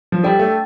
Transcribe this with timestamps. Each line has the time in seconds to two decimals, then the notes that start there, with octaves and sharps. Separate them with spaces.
0.12 F3
0.23 G3 D4 A4 D5 G5
0.39 A3